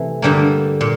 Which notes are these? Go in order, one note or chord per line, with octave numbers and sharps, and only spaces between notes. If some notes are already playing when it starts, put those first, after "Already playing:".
Already playing: C3 E3 A3
G2 D3 G3 A#3
A#2